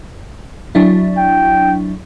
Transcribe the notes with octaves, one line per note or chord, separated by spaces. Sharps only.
F#3 D4 E4
G5